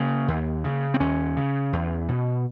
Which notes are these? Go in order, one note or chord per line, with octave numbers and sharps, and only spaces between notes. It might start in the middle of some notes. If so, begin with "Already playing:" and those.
Already playing: C#3 A#3
D#2
C#3
C4
D#2 C#4
C#3
E2
B2